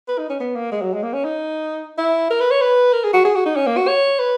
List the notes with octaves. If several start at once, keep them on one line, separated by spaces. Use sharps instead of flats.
B4
D#4
C#4
B3
A#3
G#3
F#3
G#3
A#3
C#4
D#4
E4
A#4
B4
C#5
B4
A#4
G#4
F#4
G#4
F#4
D#4
C#4
A#3
F#4
C#5
B4